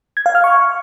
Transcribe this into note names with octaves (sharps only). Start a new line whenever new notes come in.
G#6
F5
F6
C#6